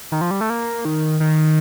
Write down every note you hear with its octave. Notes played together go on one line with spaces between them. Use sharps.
D#3
F3
G3
A3
A#3
D#3
D#3